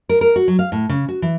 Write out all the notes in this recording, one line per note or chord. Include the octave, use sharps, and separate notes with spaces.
A#4
A#4
F#4
F#3
F5
A2
C#3
F#4
E3